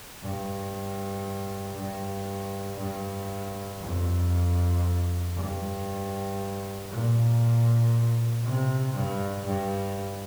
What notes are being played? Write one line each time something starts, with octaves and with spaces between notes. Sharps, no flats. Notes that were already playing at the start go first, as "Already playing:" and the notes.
G2
G2
G2
F2
G2
A#2
C3
G2
G2